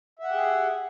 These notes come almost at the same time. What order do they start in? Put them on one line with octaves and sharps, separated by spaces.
E5 F#5 G4 G#4